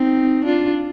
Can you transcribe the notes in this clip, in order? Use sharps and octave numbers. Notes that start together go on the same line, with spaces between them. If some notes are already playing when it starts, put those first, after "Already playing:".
Already playing: C4 D#4
D4 F4